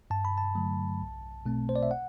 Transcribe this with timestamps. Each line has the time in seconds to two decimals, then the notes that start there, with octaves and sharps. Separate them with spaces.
0.10 G2 A5
0.25 B5
0.38 A5
0.55 D3 F#3 A3
1.01 B1
1.46 B2 A3 C4
1.69 C5
1.76 D5
1.83 E5
1.91 F#5